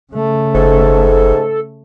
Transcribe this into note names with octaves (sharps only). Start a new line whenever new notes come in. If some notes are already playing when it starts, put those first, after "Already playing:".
C#3 A3
F#1 G#2 A4